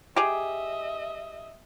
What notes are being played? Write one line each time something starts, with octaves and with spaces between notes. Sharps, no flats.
G4 G#4 D#5 E5